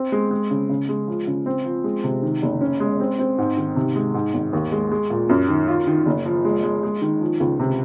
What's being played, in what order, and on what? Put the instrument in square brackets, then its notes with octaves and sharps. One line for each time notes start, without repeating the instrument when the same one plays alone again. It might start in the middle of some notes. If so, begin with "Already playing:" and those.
Already playing: [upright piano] C4
G#3
G#3
C#3
C#3
G#3
F3
C#3
C4
F3
G#3
C3
D#3
F#1
C#4
G#3
C4
C4
G#2
D#3
C3
G#3
G#2
G#1
D#2
G#3
G#3
A#2
F#2
D#3
F4
D#3
F#1
F3
G#3
G#3
G#3
D#3
F3
C#2
C3